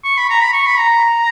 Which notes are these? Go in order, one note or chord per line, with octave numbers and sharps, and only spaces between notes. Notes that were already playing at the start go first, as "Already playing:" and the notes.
C#6
B5
A#5
B5
C#6
B5
A#5